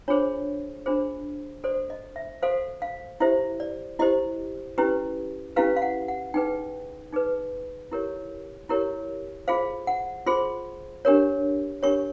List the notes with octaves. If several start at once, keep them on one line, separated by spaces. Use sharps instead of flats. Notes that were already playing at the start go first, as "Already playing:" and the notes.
D4 F4 G#4 C5 C#5
D4 F4 G#4 C5
F#4 A4 C5 D5
D#5
E5
F#4 A4 C5 F5
F5
E4 G4 C5 E5
D5
E4 G4 C5 D#5
C#4 E4 G4 B4
C#4 E4 G4 B4 F5
F5
F#5
F#5
D#4 G#4 B4 G5
D#4 G#4 B4
E4 G4 A#4 C#5
E4 G4 A#4 C#5
F4 G#4 C5 F5
F#5
F4 G#4 C5 C6
D4 G4 A#4 C#5
D4 G4 A#4 C#5 C#6